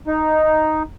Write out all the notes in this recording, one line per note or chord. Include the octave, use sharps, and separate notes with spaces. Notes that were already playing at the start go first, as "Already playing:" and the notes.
D#4